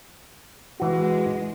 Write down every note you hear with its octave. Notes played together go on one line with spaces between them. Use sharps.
E3 G#3 F#4